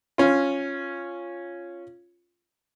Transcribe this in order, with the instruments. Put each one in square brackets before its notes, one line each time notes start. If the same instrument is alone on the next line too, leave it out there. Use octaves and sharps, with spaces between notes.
[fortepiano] C#4 F4